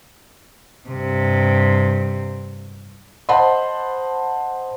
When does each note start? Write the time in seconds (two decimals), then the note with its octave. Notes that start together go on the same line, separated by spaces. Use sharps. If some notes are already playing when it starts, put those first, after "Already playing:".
0.89 G2 C3
3.29 C5 D#5 F#5 A5 B5 C6